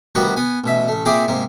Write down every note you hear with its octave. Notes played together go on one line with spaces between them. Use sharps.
D2 D#3 G3 B3 F#4 F#5
B3 G#5
A1 B2 E5
A1 A3
A#2 C4 G#4 C5 D5 E5
G#2 C3 A#3